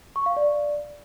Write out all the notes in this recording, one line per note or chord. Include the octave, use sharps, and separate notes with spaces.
C#6
F5
D5